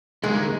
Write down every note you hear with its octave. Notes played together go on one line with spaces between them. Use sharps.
D3 G3 G#3 A#3 D#4